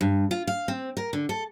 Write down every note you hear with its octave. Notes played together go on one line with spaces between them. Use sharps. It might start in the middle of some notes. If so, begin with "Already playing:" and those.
G2
F4
F5
C4
A#4
D3
A4